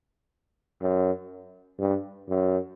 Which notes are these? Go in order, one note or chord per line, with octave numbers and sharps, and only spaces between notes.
F#2
G2
F#2